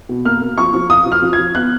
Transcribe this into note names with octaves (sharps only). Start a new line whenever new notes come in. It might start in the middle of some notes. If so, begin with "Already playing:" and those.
B2
A#3 F6
A#3
F3 C#6
F3
F4 D#6
F3
F6
F3
G#6
F3
B3 F#6